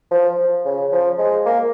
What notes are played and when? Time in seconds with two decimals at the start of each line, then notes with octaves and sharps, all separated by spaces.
0.11 F3
0.65 C#3
0.92 F3
1.18 G#3
1.46 A#3